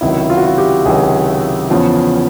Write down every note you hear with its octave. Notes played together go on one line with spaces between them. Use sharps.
C#2 C3 D#3 F#3 E4
F4
F#4
F4
G4
C#2 C3 D#3 F#3 G#4
E2 C#3 F3